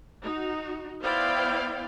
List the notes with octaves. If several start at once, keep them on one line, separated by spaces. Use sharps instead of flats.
D#4 F#4
B3 E4 C5 D5 F5 G5